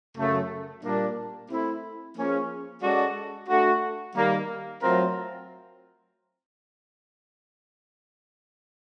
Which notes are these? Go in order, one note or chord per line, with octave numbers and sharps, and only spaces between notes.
F#2 C#3 F#3 A3
A#2 G3 A#3 D4
A3 C4 E4
F3 A#3 C#4 F4 G#4
G#3 C#4 F#4 A4 D5
A3 D4 F#4
D#3 G3 A#3
F#3 A3 C4 F4 A#4